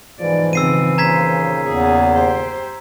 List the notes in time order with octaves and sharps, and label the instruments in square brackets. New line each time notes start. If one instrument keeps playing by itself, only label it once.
[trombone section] B1 G#2 F3 [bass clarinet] E3 [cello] D5
[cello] C#3 C4 [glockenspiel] E6 C7 D#7
[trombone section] D#2 A#2 C#3 [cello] C5 [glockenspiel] A#5 G#6 B6
[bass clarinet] E2 [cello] G#4
[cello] G4 C5